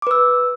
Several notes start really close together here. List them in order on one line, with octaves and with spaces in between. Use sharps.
D6 B4 E6